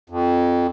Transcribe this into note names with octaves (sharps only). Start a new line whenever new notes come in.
F2